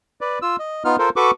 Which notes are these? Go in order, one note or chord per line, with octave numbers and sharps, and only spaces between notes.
B4 D5
F4 E6
D#5
B3 D#4 F4 F6
F4 A4 A#4 C5
F#4 A4 B4 C#6 D6